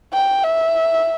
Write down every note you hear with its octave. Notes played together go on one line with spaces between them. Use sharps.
G5
E5